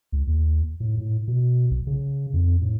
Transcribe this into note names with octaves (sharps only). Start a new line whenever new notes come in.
C#2
D#2
A2
A2
B2
B1
C#3
F2
A2